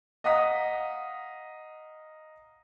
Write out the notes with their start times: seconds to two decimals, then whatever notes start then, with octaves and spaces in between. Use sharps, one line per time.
0.24 D#5 F5 F#5 A#5 D#6 B6